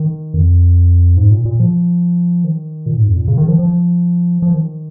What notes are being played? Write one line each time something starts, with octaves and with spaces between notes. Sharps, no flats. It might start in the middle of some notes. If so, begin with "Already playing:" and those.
Already playing: D#3
F2
G#2
A#2
A#2
F3
D#3
A#2
G#2
F2
A#2
C#3
D#3
F3
F3
F3
D#3